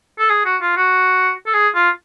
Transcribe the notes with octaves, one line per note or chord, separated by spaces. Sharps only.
A4
G#4
F#4
F4
F#4
A4
G#4
F4